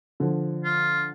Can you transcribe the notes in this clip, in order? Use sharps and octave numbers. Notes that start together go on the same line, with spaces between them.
D3 F3
F4